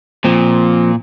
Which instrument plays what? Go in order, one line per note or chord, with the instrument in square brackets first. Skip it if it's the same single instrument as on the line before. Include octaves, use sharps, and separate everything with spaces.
[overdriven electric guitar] A#2 [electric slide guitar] F3 C4